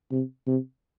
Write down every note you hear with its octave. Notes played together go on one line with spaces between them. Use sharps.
C3
C3